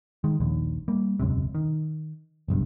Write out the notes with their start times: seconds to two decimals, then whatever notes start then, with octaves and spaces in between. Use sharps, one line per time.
0.24 D#3 G#3
0.40 D#1 A#1 D#2
0.88 G3 A#3
1.20 E1 C#2 F#2 C3
1.55 D#3
2.48 F#1 B1 G2